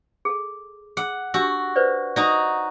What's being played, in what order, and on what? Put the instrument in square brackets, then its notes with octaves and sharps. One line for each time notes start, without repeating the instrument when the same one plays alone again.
[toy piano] G#4 A4
[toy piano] G#4 [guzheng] F#5
[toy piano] D4 G4 E6 [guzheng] F#4
[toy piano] B4 C5 D5
[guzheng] D#4 F#4 [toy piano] D5